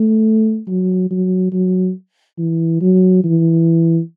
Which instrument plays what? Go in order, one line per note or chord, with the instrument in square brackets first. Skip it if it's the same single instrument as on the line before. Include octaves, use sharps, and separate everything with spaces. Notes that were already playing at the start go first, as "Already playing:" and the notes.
Already playing: [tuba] A3
F#3
F#3
F#3
E3
F#3
E3